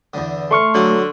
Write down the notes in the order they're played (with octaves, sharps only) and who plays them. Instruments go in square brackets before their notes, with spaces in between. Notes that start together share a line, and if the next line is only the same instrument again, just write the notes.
[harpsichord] E2 D3
[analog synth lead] A3 [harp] C6 C#6 F6
[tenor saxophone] D3 [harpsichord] F#3 A#3